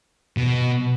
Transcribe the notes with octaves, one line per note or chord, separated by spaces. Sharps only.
B2